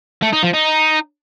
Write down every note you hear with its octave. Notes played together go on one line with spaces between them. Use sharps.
A3
D#4
F3
D#4